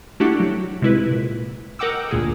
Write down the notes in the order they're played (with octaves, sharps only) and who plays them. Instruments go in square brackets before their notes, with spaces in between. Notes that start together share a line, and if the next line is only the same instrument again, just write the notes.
[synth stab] A3 D4 E4 F#4 G4 F#5
F#3
C3 G#3 E4 B4
A#2
A#4 D#5 F#5 G5 D6 E6
D2 A#2 G#4